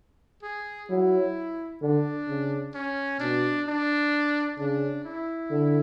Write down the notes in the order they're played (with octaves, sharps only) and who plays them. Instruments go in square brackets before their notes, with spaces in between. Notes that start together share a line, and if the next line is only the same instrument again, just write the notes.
[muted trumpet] G#4
[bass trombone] F#3 [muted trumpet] E4
[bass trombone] D3 [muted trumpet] D4
[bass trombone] C#3
[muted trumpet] C#4
[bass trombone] B2 [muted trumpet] D4
[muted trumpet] D4
[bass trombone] C#3 [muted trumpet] D4
[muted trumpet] E4
[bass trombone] D3